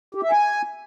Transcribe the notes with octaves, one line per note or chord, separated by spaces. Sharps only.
G4
E5
G#5